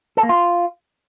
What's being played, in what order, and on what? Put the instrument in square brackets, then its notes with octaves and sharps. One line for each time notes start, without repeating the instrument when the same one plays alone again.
[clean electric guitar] A4
A#3
F4